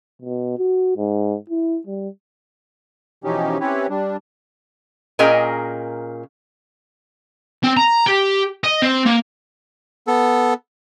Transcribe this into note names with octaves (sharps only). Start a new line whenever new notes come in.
B2
F#4
G#2
E4
G3
B2 E3 F3 C#4 D#4 G4
C4 C#4 E4 G4 B4 C#5
G3 D4
A#2 C#4 G#4 A#4 D#5 G5
C4
A#5
G4
D#5
C4
A#3
B3 A4